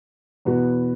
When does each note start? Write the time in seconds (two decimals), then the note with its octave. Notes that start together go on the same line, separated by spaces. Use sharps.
0.45 E2 B2 B3 F#4